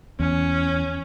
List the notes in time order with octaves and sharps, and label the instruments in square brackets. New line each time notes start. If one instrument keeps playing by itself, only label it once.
[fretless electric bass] E2 [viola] C#4